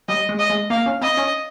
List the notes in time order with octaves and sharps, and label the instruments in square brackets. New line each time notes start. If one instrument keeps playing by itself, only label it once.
[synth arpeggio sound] G3 [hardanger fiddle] D#5
[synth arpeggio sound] G#3
[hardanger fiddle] D#5
[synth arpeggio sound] G#3
[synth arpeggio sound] A#3 [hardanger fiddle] F5
[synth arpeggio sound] C#4
[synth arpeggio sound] C4 [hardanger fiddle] D#5
[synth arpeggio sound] C#4